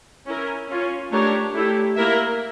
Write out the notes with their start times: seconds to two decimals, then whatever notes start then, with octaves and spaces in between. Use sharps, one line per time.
0.26 C#4 E4 A#4
0.69 C#4 F4 C#5
1.12 A3 D4 G4 A#4 C#5
1.54 A3 E4 G4
1.96 A#3 E4 A#4 E5